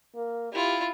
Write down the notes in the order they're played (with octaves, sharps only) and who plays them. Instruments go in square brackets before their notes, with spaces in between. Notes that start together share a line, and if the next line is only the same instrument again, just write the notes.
[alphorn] A#3
[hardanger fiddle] E4 F4 [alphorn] G4